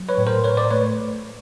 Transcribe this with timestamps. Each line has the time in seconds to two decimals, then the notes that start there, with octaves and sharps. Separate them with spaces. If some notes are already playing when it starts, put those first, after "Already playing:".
Already playing: F#3
0.09 B4 C#5
0.18 A2
0.27 A#4 C5
0.44 A2 B4 C#5
0.57 C5 D5
0.71 A3 B4 C#5